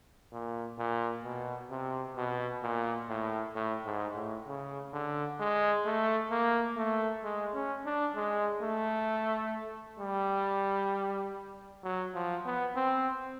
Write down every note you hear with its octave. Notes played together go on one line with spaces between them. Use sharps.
A#2
A#2
B2
C3
B2
A#2
A2
A2
G#2
A2
C#3
D3
G#3
A3
A#3
A3
G#3
C#4
D4
G#3
A3
G3
F#3
F3
B3
C4